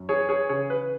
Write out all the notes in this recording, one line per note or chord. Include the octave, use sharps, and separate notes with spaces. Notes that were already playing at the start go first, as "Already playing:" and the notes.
Already playing: F#2
E3 G#4 C#5
G#4 C#5
C#3 G#4 C#5
B4